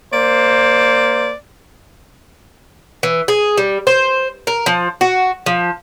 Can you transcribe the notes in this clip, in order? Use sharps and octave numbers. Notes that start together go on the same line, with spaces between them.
A#3 C5 D5
E3
G#4
G3
C5
A#4
F3
F#4
F3